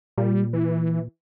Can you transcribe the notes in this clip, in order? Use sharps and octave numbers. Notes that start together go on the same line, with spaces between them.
A#2 G3
E3